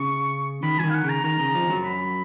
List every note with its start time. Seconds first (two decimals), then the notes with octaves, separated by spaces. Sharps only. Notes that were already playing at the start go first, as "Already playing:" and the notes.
Already playing: C#3 C#6
0.63 D#3 B5
0.79 F3 G#5
0.84 D#3
0.90 F5
0.94 F#5
1.04 C#3 A#5
1.24 D#3 A#5
1.39 C#3
1.55 F2 F3
1.70 F#2 F#3
1.85 B5